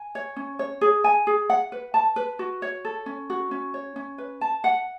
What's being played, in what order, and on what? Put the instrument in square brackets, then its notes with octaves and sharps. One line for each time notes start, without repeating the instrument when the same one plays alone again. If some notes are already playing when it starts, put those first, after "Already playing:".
Already playing: [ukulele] G#5
C#5
C#4
C#5
G#4
G#5
G#4
F#5
B4
A5
B4
F#4
C#5
A4
C#4
F#4
C#4
C#5
C#4
B4
A5
F#5